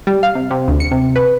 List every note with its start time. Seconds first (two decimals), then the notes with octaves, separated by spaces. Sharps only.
0.07 G3
0.23 F5
0.35 C3
0.51 C3
0.68 D2
0.80 C#7
0.91 C3
1.16 B4